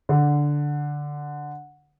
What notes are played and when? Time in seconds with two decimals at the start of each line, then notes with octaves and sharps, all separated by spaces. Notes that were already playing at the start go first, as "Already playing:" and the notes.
0.09 D3